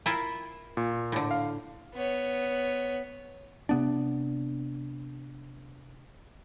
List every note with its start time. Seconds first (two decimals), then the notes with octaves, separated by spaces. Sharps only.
0.06 E4 F4 A#4
0.77 A#2
1.12 A2 D3
1.31 F5
1.94 B3 C#5
3.69 C3 B3 D4